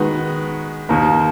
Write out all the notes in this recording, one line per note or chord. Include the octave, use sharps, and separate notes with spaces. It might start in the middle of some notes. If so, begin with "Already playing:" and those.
Already playing: D#3 G#3 B3 F#4
D#2 D#3 A#3